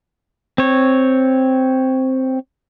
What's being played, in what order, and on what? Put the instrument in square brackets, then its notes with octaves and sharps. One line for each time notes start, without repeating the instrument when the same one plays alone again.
[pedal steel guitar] C4 C#5